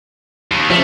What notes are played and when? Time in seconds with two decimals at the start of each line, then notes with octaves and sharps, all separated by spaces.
0.51 D#2
0.70 C#3 F3 A3